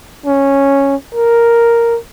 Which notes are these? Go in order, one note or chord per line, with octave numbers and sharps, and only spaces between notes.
C#4
A#4